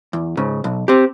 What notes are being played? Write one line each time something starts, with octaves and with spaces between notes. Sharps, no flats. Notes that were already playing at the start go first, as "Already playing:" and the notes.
E2
G#2 C#3
B1
C4 G4